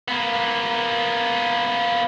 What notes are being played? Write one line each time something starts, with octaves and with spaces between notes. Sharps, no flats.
A#3 B3